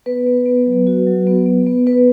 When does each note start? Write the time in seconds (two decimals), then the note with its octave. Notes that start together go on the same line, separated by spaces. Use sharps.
0.06 B3 B4
0.26 B3
0.46 B3
0.66 F#3
0.87 F#4
1.07 F#3
1.27 B3
1.46 B3
1.67 B3
1.86 B3 B4